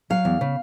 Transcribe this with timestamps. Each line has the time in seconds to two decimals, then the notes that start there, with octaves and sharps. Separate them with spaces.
0.10 F#3 F5
0.25 E2
0.41 C#3